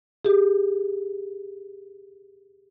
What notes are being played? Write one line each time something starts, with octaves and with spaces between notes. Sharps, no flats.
G4 G#4